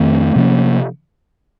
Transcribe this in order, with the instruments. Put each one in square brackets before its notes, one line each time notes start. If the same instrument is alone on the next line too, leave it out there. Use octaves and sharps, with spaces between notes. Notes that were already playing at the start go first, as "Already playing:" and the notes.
Already playing: [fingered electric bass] F2 D#3 A3 C4
C3 F3 A#3 C#4